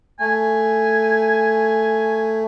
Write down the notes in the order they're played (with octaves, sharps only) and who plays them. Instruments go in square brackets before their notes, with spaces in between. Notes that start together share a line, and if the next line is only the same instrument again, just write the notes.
[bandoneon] A3 [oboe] G#5